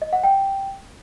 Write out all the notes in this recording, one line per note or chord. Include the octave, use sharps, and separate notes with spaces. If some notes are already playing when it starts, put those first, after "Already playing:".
D#5
F#5
G5